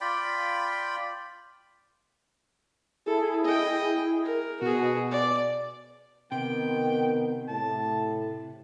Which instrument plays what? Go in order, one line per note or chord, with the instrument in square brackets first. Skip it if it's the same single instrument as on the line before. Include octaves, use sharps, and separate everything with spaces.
[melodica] F4 D5 G5 B5
[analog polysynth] E4 G#4 [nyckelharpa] A4
[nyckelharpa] D#5 G5
A#4
[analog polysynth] B2 [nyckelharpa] F#4 G#4
[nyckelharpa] D5
[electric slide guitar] C3 [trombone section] D#3 B3 [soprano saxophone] G5
[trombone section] A2 [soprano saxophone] A5